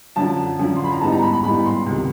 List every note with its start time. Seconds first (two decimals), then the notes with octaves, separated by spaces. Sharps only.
0.16 F#2 D3 F3 A5
0.59 F#2 D3 F3
0.77 C6
0.84 B5
0.93 A#5
1.01 G#2 E3 G3 B3 D#4 A5
1.12 A#5
1.22 B5
1.33 B5
1.44 G#2 E3 G3 B3 D#4 B5
1.66 C6
1.86 C#2 C3 D#3